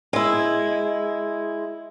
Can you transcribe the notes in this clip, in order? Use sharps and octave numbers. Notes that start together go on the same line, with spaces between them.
G#3 E4